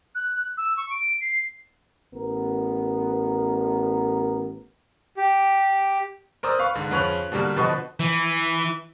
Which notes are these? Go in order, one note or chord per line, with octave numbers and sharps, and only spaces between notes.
F#6
E6
C#6
D7
C7
A1 B3 A#4
G4
A#4 C5 D5 D#6 E6
B4 F5 C#6
G#2 D3
F2 C#3 B4 C#6 F#6 F7
B2 D3 G3 A#3
B2 D3 F3 B4 D#5 C#6
E3